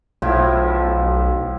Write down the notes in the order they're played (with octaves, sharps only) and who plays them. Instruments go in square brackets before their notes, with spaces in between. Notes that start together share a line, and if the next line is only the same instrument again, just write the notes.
[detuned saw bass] B1 [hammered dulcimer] A2 F3 E4